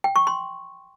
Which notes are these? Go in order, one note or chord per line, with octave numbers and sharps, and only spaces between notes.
G5
C#6
C6